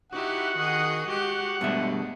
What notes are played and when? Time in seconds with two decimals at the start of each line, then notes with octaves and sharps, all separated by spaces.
0.13 D#4 E4 F#4 G4 F#5
0.59 D#3 G#4 D#5
1.09 G#3 G4 F#5
1.61 G2 B2 G#3 A3 E5